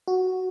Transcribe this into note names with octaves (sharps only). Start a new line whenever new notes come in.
F#4